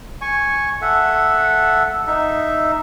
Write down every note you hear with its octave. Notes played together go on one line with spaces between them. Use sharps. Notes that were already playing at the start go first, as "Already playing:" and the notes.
G#5 C#6
A4 E5 F#5
D#4 E5